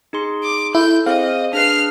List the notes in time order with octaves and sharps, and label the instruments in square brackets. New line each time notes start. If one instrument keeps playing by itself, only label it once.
[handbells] D#4 G#4 C6
[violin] D6
[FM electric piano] E4 [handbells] A4 [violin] G6
[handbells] C4 G#4 C5 [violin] D#5 [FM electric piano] F5
[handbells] D4 G#4 B4 [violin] F6 C7